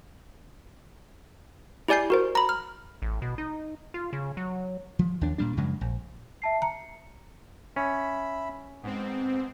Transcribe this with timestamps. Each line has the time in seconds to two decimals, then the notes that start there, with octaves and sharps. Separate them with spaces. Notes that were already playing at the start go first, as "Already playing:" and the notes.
1.88 E4 G4 D5 G#5 G6 C7
2.10 F#4 A#4 C5
2.35 A#5 B5
2.49 F6
3.02 A1
3.22 B2
3.38 D#4
3.94 F4
4.13 C#3
4.37 F#3
4.99 F3
5.21 D#2 D4
5.38 A#2 G3 D4
5.57 F#2 C#3 F3 G#3
5.81 A#1
6.42 E5 A5 C7
6.62 A#5 C#7
7.76 C#4 E5 B5
8.83 G#2 B3 C4